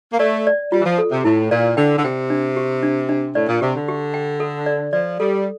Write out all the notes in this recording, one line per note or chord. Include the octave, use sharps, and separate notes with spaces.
A#3
A3 D5
D5
G3 F4
E3
F3
A4
C3
A2 E4
A#2 D5
D3 G5
D3
C3 G5
D4
G4
D4
D4
A2 D5
A#2
C3 G4
D3
G4
G5
A4
D5
F3 D5
G3 A4